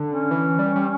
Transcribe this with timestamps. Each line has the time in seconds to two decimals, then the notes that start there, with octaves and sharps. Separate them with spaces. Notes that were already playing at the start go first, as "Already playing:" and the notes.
Already playing: D3
0.11 C#4
0.31 E3
0.59 G3
0.76 G3